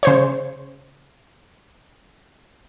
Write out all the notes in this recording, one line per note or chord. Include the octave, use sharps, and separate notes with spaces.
C#3 C5 C#5